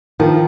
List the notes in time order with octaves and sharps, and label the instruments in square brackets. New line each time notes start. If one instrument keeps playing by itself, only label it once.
[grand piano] D#3 [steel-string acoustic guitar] F3